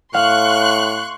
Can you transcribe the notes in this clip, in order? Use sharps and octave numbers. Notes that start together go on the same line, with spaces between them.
A2 F5 C6 C#6 F#6